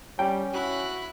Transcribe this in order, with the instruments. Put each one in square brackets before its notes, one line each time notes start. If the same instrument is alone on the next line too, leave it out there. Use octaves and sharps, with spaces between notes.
[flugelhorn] G3 [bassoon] C#4 [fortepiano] G5
[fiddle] E4 F#6 [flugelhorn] F#4